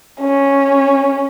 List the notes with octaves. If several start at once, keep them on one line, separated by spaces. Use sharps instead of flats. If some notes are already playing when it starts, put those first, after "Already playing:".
C#4